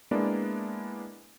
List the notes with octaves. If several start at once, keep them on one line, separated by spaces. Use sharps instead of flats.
G#3 A#3 B3 D4 E4 D5